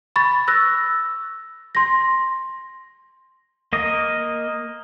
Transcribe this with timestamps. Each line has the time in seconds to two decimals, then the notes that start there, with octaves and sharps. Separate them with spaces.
0.16 B5 C#6 A6
0.48 E6 F#6 A#6
1.75 C6 A#6
3.73 A#3 D#5